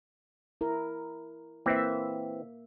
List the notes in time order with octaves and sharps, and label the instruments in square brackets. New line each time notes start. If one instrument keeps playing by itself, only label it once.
[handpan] E4 A#4
[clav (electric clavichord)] E3 C4 [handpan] A#3 E5